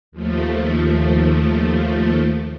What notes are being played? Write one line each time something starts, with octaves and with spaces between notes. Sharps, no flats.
D#2 F3 A3